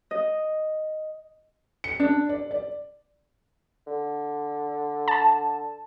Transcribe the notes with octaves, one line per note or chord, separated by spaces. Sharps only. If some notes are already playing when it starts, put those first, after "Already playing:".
D#5
C#7
D4
D5
D5
D3
A5